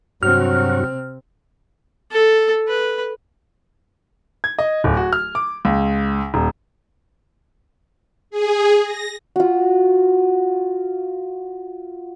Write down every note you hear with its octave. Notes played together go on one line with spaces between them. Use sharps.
G2 C3 F#3 C4 F#4 F6
A4
B4
G#6
D#5
D1
F#4
F6
D6
C#2
D#1
G#4
A#6
F4 F#4